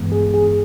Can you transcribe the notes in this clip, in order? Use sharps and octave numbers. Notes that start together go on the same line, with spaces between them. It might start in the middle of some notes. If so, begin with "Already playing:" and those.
Already playing: G2 E3 G#3 B3
G#4
G#4